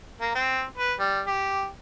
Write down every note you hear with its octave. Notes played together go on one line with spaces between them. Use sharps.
A#3
C4
B4
G3
G4